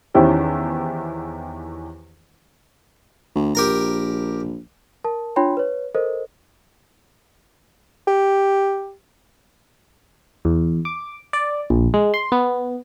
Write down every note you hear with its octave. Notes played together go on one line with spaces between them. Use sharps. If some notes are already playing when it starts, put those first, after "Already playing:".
E2 D#3 C#4 E4 G4 C5
D2
A#1 G4 A#4 A#5
A#4 A5
D4 F4 C#5 G5 B5 C6
B4 C#5
A4 A#4 C5 D#5
G4
E2
D6
D5
A#1
G#3
C6
B3